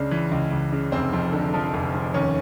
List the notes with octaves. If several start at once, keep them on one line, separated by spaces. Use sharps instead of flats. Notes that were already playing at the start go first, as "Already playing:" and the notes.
Already playing: C#2 C#3 D4
E3
C#2
C#2
C#3
F1 C4
F2
D3
F3
F1
F2
D#2 C#4